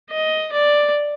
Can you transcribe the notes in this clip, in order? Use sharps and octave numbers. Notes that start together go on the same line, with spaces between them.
D#5
D5